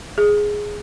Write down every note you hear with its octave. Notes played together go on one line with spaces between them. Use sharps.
G#4